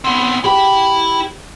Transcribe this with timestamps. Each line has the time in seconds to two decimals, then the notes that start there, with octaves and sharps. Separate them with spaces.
0.04 B3 C4
0.44 E4 G4 F#5 G5 B5